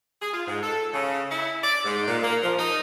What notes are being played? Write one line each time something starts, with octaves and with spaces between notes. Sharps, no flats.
G#4
F4
G#2
A4
C#3
E4
D5
G#2
A#2
A#3
F3
D#4